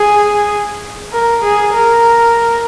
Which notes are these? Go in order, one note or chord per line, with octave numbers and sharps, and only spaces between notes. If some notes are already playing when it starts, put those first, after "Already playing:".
Already playing: G#4
A#4
G#4
A#4